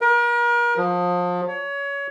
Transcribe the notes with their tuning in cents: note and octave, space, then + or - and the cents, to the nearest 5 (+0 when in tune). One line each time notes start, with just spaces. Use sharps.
A#4 +40
F3 +30
C#5 +25